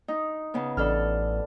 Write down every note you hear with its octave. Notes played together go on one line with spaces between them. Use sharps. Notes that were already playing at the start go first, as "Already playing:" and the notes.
D#4
C#3 B3
A1 D4 A4 F6